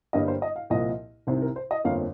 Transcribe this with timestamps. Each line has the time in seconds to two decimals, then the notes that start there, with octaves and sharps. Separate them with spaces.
0.13 G1 G2 G3 A#3 D#5
0.28 C5
0.42 D#5
0.56 F5
0.70 C2 A#2 F3 D#5
1.27 C2 C3 D#3 C4 C5
1.42 A#4
1.56 C5
1.71 D#5
1.84 G1 F2 F3 A#3 F5